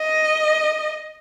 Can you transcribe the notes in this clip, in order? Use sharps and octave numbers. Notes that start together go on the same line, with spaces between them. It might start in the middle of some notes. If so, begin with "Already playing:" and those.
Already playing: D#5